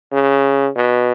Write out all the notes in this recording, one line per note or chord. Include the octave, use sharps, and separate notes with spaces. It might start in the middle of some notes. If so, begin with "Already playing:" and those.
C#3
B2